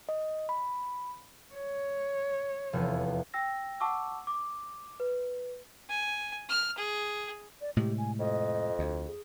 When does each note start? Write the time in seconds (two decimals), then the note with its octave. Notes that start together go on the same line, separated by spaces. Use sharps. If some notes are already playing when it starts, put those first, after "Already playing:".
0.09 D#5
0.49 B5
1.54 C#5
2.73 F1 E2
3.34 G5 E6 A#6
3.80 F#5 A5 C#6 D6 E6
4.27 D6
5.00 B4
5.90 G#5
6.49 F6
6.78 G#4
7.61 D5
7.77 A2 C3 G#3 G4
7.98 G#5
8.19 F2 D#5
8.79 D2
9.07 G#4